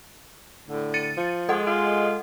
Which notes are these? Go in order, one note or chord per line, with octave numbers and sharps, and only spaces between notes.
A2 D3
A6 C#7 D#7
F3
G#3 A4 D#5 F#5
F4